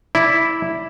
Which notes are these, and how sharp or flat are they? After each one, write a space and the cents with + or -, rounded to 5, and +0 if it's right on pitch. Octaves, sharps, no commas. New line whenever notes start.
E4 -5 D5 -5